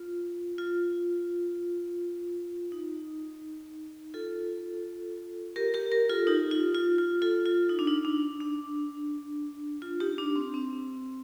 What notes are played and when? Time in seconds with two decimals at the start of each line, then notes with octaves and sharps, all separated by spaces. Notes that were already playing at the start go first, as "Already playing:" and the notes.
Already playing: F4
0.58 F4
2.72 D#4
4.14 F4 A4
5.56 G4 A#4
5.74 G4 A#4
5.92 G4 A#4
6.09 F4 A4
6.27 D#4 G4
6.51 F4
6.75 F4
6.98 F4
7.22 F4 A4
7.45 F4
7.69 D#4
7.79 D4
7.88 D#4
8.05 D4
8.40 D4
9.82 F4
10.00 D#4 G4
10.18 D4
10.36 C4
10.54 C4